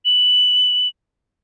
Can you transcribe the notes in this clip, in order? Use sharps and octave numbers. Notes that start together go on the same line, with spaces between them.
F#7